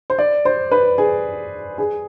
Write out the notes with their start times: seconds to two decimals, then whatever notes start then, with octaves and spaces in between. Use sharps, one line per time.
0.10 C5
0.19 D5
0.45 C5
0.72 B4
0.98 G#4
1.78 G#4